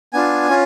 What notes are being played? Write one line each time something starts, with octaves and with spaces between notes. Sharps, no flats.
B3 D4 F4 G#5
C#4 F4